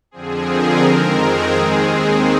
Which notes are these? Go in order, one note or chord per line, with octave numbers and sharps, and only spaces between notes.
F2 D3 F3 C4 G#4
A#4
F2 D#3 G#3 C4
G#4
D#2 D#3 G#3 C4